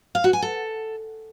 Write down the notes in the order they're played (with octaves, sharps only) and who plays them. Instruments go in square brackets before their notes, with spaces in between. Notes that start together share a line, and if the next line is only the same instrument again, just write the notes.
[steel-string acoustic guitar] F5
F#4
G#5
A4